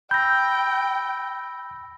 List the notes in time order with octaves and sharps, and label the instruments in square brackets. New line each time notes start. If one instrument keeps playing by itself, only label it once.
[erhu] G5 [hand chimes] B5 E6 A#6 [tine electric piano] G6